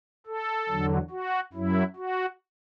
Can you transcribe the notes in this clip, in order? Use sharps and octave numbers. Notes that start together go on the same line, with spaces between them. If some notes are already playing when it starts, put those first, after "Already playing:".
A4
E2 D3 F#3
F#4
F#2 F#3 E4
F#4